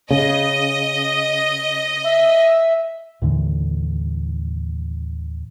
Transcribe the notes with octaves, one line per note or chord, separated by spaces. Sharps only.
C#3 D#5
E5
D#2 A2 D3 E3